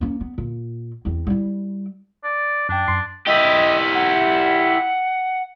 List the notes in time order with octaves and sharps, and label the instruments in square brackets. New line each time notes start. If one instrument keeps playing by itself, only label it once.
[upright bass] A#3 C#4
B3
A#2
E2 C4
G3 E4
[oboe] D5
[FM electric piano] F#2 G5 [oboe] D4
[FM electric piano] F#2 C6 C7
[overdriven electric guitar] E4 G4 [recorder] D#5
[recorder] F#5